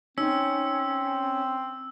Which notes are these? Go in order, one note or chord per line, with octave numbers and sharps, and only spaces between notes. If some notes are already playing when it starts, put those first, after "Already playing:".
C4 C#4 D#4 E6